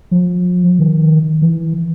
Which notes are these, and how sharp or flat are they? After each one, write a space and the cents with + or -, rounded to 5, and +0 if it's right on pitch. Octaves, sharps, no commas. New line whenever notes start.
F3 +40
D#3 +10
E3 -5